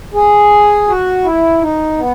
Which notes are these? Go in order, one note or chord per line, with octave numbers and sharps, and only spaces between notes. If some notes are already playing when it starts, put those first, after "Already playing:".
G#4
F#4
E4
D#4
B3